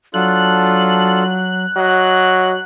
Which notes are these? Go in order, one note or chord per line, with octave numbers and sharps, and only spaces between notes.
F#3 D4 F4 A4 F#6
F#3 D#5